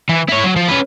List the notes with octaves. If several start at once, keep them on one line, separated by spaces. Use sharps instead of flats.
E3
E4 C#5
F#3
F3
C#4 B4